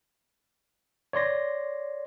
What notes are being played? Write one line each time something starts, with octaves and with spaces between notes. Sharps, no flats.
C#5 D5 C6 A#6